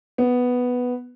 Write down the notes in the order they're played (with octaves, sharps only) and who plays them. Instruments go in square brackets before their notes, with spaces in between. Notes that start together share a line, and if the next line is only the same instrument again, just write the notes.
[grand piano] B3